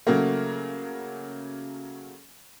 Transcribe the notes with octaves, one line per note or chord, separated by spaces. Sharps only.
C#3 F#3 A3 A#3